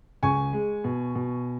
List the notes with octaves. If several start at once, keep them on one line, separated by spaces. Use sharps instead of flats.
C#2 G#5 C#6
G#3
B2
B2